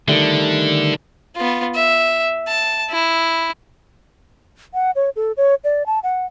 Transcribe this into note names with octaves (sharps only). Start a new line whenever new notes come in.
D3 D#3 G3 A3
B3 F4
E5
A5
E4
F#5
C#5
A4
C#5
D5
A5
F#5